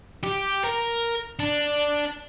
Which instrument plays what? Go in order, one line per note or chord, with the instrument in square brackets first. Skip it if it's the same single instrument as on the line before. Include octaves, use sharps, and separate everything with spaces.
[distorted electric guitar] G4
A#4
D4